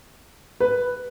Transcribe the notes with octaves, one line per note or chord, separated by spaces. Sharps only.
B4